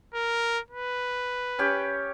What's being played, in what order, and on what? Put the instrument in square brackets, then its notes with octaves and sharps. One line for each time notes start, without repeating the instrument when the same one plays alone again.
[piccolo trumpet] A#4
B4
[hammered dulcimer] C#4 G4